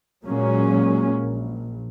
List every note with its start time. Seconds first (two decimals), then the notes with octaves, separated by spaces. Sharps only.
0.24 A#2 F#3 G#3 A#3 C#4
1.21 A#1